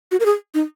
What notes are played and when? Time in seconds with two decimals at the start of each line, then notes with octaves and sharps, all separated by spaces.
0.11 F#4
0.20 A#4
0.26 G#4
0.54 D#4